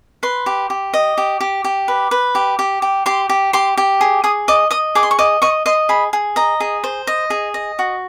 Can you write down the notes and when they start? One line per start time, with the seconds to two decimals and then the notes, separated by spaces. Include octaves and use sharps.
0.23 B4 C6
0.46 G4
0.70 G4
0.94 D#5
1.18 G4
1.41 G4
1.64 G4
1.88 B4
2.11 B4
2.35 G4
2.59 G4
2.82 G4
3.06 G4 C6
3.29 G4
3.53 G4 C6
3.77 G4
4.01 G#4
4.24 G#4 D#6
4.48 D#5 D6
4.71 D#5 D#6
4.95 G#4 D6
5.03 C6
5.11 C#6
5.19 D#5 D6
5.42 D#5 C#6
5.66 D#5 C6
5.89 G#4 B5
6.13 G#4
6.36 D#5 A#5
6.60 G#4
6.84 C5
7.07 D#5
7.30 G#4
7.54 D#5
7.79 F#4